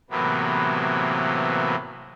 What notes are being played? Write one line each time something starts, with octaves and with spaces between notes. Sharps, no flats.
A2 C3 E3 F#3 A#3 B3